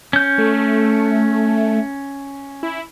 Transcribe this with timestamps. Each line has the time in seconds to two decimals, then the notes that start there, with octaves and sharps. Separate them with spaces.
0.13 C#4 G6
0.38 A3
2.63 E4